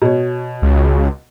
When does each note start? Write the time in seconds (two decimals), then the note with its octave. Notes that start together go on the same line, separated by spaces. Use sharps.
0.02 B2 C#5
0.62 C#2